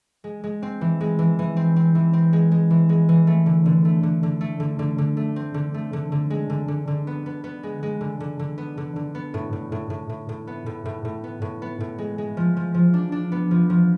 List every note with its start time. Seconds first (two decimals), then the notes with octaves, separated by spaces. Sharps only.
0.24 G#3
0.44 G#3
0.62 C4
0.81 E3
1.01 G#3
1.19 E3
1.39 E3
1.57 C4
1.76 C4
1.95 E3
2.13 C4
2.33 G#3
2.51 G#3
2.70 E3
2.89 G#3
3.09 E3
3.27 A3
3.46 D3
3.66 D3
3.85 A3
4.03 D3
4.23 D3
4.41 A3
4.60 D3
4.79 D3
4.98 D3
5.17 A3
5.36 C4
5.54 D3
5.74 A3
5.93 D3
6.12 D3
6.30 G#3
6.50 D3
6.68 D3
6.88 D3
7.07 B3
7.26 B3
7.44 B3
7.63 G#3
7.83 G#3
8.01 D3
8.20 D3
8.39 D3
8.58 B3
8.78 D3
8.96 D3
9.15 B3
9.34 A2
9.53 A2
9.72 A2
9.90 A2
10.09 A2
10.29 A2
10.47 B3
10.66 A2
10.85 A2
11.05 A2
11.24 B3
11.42 A2
11.62 B3
11.80 A2
11.98 G#3
12.18 G#3
12.37 F3
12.56 F3
12.74 F3
12.94 D4
13.12 D4
13.32 B3
13.51 F3
13.70 F3